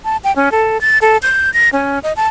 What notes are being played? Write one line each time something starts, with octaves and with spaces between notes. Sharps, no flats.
A5
G5
C#4
A4
A6
A4
G6
A#6
C#4
D#5
A5